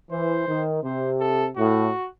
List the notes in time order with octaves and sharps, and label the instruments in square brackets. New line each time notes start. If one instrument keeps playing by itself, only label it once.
[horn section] E3 [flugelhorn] C5
[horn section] D#3
[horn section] C3 [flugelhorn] C5
[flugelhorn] A4
[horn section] A2 [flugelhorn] F#4